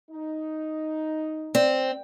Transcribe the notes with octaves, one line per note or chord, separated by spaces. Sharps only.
D#4
C4 D5